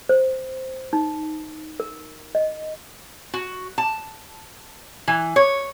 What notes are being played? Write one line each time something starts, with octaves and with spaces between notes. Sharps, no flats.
C5
D#4
A#4
D#5
F#4
A5
E3
C#5